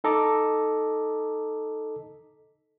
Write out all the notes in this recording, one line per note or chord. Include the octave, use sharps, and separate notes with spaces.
D#4 A4 D#5 A#5 D6